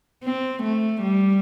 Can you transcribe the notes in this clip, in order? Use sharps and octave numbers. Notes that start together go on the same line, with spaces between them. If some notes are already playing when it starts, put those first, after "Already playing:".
C4
A3
G3